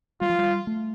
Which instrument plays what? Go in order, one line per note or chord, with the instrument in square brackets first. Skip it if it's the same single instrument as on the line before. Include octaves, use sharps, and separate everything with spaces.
[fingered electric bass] G3 [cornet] F4
[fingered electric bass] F3
G3
A3